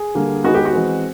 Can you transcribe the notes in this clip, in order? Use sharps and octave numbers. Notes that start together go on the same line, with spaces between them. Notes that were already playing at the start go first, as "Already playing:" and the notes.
Already playing: G#4
D3 G3 A#3
D#3 G#3 B3 F#4
G4
F#4
E3 G#3 C4